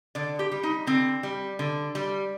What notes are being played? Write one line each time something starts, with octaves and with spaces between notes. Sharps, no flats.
D3 D5
G4
G3
D#4
D3 C4
G3
D3
G3